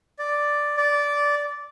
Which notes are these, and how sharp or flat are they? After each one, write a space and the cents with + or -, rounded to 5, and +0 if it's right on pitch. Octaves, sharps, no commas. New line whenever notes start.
D5 +0
D5 -15